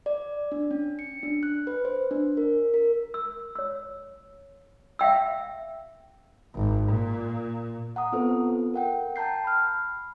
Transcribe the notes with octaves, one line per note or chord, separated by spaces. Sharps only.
D5
D4
C#4
C#7
D4
F#6
B4
C5
D4
A#4
A#4
E6
C#5 E6
E5 F5 G5 E6
G#1
A#2
F#5 A#5 D#6
B3 C4 F4 A4 B4 C5
A#4 F#5 G5
G5 A5 A#5 G6 C7
B5 F6